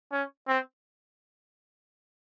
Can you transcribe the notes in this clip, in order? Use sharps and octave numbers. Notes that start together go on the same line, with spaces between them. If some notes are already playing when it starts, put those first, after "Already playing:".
C#4
C4